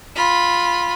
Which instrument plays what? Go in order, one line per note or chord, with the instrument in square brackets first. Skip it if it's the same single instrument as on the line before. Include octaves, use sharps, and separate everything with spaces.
[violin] F4 B5